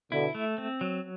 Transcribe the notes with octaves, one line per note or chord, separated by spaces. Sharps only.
B2 D3 E4
A3
C4
F#3